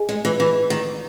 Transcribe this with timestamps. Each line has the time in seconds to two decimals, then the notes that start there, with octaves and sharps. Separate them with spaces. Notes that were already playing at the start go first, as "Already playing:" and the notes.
Already playing: G#4 D#5 G#5
0.09 G#3
0.25 E3
0.40 E3
0.70 D#3